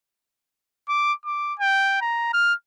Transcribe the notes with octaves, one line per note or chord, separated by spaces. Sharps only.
D6
D6
G5
A#5
F6